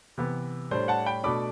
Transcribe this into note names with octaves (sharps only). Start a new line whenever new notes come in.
C3 E3 B3
A2 G3 D4 C5
F#5 A5
G5 B5
B2 A3 D4 B5 D6